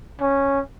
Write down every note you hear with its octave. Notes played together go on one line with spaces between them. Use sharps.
C#4